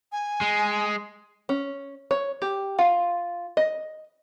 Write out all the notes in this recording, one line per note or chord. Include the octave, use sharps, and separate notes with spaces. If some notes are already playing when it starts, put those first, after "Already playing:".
G#5
G#3
C#4
C#5
G4
F4
D#5